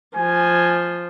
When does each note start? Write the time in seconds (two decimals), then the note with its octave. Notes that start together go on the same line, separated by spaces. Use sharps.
0.16 F3 G#5